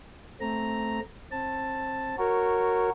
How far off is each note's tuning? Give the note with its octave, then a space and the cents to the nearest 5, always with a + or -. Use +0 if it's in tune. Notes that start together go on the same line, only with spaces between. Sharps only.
A3 +0 C4 +0 A#5 +0
C4 +25 A5 +5
F#4 +0 A#4 -10 C#5 -10